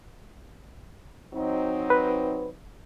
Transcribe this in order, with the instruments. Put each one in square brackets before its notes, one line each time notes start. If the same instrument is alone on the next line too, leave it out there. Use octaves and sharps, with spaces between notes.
[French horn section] F#3 C4 D#4
[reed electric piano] B4